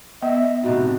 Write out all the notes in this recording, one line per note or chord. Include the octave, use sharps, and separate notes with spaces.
B3 D#5 E5
F2 A2 C3 D#4 F#4